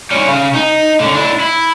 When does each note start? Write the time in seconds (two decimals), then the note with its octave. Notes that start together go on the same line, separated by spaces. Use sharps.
0.11 G3 C#4
0.27 C#3
0.54 D#4
1.00 D3 C#4
1.14 D4 E4
1.40 E4